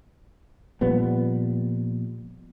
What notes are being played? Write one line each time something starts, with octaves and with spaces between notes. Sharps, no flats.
A#2 F3 G3 B3